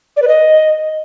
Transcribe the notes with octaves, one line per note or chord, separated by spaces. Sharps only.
D5
B4
D#5